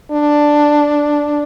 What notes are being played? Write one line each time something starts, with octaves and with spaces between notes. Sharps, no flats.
D4